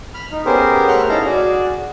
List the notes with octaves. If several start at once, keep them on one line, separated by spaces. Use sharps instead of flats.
B5 F6
D#4
B3 C#4 G4 G#4 A#4 C5
A3 A#4 E5 F#5 F6 G6
C#4 D#4 E4 A4 F5 A#5
F#4 G#4 D5